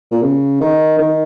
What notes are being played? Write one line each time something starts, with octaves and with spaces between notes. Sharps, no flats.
A#2
C#3
D#3
D#3